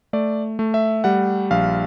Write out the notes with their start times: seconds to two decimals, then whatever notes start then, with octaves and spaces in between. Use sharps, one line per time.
0.13 A3 D5
0.59 A3
0.74 E5
1.04 G3 F#5
1.51 A#1 F5